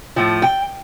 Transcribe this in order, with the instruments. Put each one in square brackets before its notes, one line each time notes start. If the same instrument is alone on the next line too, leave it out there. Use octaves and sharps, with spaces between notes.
[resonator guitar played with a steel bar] A2 F3
G5